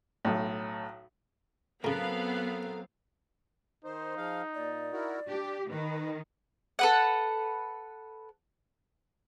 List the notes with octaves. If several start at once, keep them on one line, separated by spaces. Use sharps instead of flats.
B1 A2
A2 C#3 F#3 B3 C4 A4 A#4 F5
D#3 D#4 C5
F3 G#4 F5
A#2 D5
E4 F#4 A#4
D4 G4
D#3 B4
A4 B4 F#5